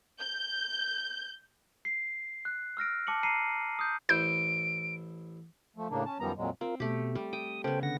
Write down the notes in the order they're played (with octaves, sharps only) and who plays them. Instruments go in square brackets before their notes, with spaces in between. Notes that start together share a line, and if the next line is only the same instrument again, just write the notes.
[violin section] G6
[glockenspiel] C7
F#6
E6 F6 A#6 D7
A5 D6 C#7 F#7
A#5 C7 C#7 D#7
D#6 G6
[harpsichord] A1 E4 C5 [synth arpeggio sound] G6 [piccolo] D7
[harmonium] F3 A3
A2 C#3 A#3 D4
C#4 A5
F#2 D#3 F3 G3 B3 A#5
F2 A#2 F#3 G#3
[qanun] C4 [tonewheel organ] F4 A#4
[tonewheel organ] B2 [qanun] A3 G4
[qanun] G3
[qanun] G5 [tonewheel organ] D#6
[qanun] C#3 B3 [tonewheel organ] A4 C5 G5
[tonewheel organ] D3 F#5 A#6